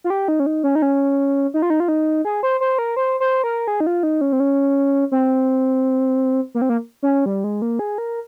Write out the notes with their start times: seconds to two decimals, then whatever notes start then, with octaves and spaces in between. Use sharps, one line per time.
0.04 F4
0.10 G4
0.28 D#4
0.40 C#4
0.46 D#4
0.64 C#4
0.75 D#4
0.82 C#4
1.54 D#4
1.62 F4
1.70 D#4
1.80 F4
1.88 D#4
2.25 G#4
2.43 C5
2.61 C5
2.79 A#4
2.97 C5
3.20 C5
3.44 A#4
3.68 G#4
3.80 D#4
3.87 F4
4.03 D#4
4.21 C#4
4.32 C4
4.40 C#4
5.12 C4
6.55 A#3
6.62 C4
6.69 A#3
7.03 C#4
7.26 G3
7.44 G#3
7.62 A#3
7.79 G#4
7.98 A#4